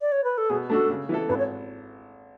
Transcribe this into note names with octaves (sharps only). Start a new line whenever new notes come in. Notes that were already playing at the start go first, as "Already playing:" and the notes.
D5
C#5
B4
A4
B2 G#4
A3 D4 F#4 A4
C#3
E3 B3 E4 A4
G#1 B4
C#5